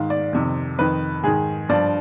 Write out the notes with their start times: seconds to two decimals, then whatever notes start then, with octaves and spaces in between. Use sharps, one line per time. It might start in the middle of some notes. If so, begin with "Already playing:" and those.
Already playing: G#2 D#3 F5
0.10 D5
0.33 F2 C3 D#3
0.79 F2 D#3 B4
1.23 G#2 D#3 G#4
1.69 G2 F3 D5